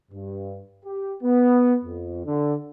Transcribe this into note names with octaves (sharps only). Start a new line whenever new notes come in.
G2
G4
B3
F2
D3